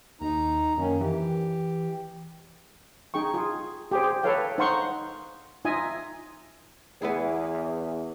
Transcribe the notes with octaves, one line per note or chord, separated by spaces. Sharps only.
D#2 D#4 A#5
F#2 D#3 A#3 C#4
E3 G4
D#4 G#4 G5 C#6
F4 G#4
G4 G#4 C5
A4 B4 C#5 F5 G5
D#4 C5 F5 F#5 C6 C#6
D#4 F4 D#5 E5 G#5
E2 B3 E4 G#4